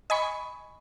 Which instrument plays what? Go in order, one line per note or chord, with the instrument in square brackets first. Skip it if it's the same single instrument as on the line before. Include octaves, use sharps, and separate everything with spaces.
[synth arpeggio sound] D#5 G#5 B5 C#6